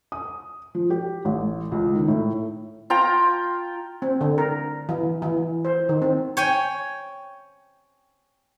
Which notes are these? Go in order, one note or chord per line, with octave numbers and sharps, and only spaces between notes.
D#6
F3
G4
A1
C#2
D#3
A2
F4 G5 A#5
C4
D3
A#4
E3
E3
C5
D#3
C4
C#5 G5 G#5